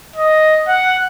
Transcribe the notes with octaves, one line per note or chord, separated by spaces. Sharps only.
D#5
F#5